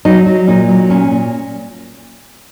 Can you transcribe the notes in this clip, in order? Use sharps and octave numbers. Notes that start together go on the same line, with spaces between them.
F#3 D#4
F#3
A#2 D#4
F#3
A#2 C#4
A#2